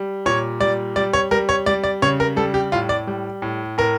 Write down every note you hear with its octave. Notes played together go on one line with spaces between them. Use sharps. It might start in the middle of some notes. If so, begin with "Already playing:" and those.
Already playing: G3
A#2 C#5
G3 D5
G3 D5
C#5
G3 A#4
C#5
G3 D5
D5
C#3 C#5
A#4
G3 A4
G4
A2 F4
D5
G3
A2
A2 A#4